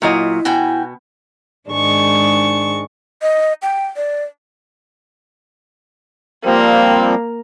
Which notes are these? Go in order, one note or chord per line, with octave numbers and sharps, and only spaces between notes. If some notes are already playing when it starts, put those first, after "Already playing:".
A#2 F#3 E4 D#5
B2 F#4 G5 G#5
G#2 D#3 G#3 D4 C#6
D#5
G5
D5
F3 G3 A#3 C4